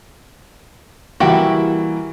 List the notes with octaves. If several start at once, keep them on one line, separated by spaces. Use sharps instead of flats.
E3 G3 A#3 E4 F#4 G4